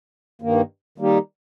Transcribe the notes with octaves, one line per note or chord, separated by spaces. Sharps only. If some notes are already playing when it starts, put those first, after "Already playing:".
G2 D#3 A#3
D#3 G3 A#3 D#4 G4